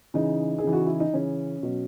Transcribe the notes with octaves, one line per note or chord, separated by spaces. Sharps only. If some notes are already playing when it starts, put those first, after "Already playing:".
C#3 E3 D#4
G#4
C#3 E3
F#4
E4
D#4
C#3 E3 C#4
B2 F#3